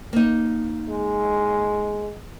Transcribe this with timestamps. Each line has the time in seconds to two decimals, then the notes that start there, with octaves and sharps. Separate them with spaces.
0.13 A#3 D#4
0.89 G#3